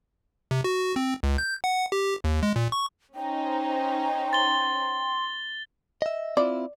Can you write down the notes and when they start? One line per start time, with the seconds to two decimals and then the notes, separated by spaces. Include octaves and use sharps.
0.51 C3
0.64 F#4
0.96 C4
1.23 C#2
1.38 G6
1.64 F#5
1.92 G4
2.24 D#2
2.43 G#3
2.56 A#2
2.72 C#6
3.15 C#4 D#4 C5 G5
4.33 C6 A6 G7
6.02 D#5 E5
6.37 C4 E4 F4 D5